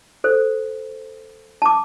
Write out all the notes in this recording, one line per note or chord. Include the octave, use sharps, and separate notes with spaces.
A4 C5
A5 D6